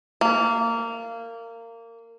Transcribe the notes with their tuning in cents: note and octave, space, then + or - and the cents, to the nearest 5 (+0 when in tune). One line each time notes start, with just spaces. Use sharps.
A#3 -20